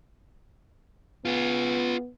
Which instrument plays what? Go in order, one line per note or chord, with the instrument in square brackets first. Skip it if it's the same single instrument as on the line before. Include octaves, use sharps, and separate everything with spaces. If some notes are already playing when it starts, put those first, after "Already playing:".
[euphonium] B3 [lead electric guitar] F4 G#4